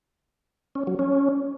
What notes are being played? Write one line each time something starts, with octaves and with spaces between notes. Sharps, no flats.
C#4
F#3
C#4